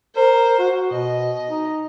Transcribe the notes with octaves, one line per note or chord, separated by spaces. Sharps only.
A#4 C5
F#4
B2 D#5
D#4